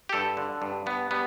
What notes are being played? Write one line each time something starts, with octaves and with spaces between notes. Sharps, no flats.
G4
G2 A4
D3
G2
G2 B3
G3 B3